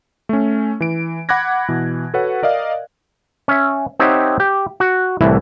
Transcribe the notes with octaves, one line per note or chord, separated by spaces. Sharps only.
A3 C#4
E3 D7
F#5 B5 D6 F#6 G#6 A#6
B2 E3
F#4 A4 B4 C#5 F#5
A#4 D5 D#5 F5
C#4 E5
C4 D#4 G4 C#5 E5 F#5
G4
F#4
C2 A2 E3 E4